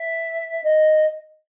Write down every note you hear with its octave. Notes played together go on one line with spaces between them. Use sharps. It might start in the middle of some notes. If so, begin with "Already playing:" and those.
Already playing: E5
D#5